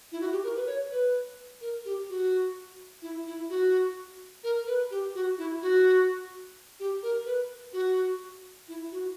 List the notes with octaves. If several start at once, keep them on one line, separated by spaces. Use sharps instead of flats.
E4
F#4
G4
A#4
B4
C#5
B4
A#4
G4
F#4
E4
E4
F#4
A#4
B4
G4
F#4
E4
F#4
G4
A#4
B4
F#4
E4
F#4